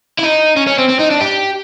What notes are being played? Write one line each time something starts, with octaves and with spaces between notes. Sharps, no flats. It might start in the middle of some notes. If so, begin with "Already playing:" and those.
E4
D#4
C#4
C#4
C4
C4
D#4
D4
G4